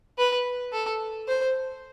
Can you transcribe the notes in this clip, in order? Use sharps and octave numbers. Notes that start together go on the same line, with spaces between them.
B4
A4
C5